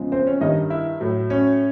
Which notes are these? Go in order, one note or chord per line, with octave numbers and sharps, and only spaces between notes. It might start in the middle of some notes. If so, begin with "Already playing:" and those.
Already playing: E2 C#3 F3 G#3
C4 C5
C#4 C#5
G2 D#3 G3 D#4 D#5
E4 E5
A2 F#3
C#4 C#5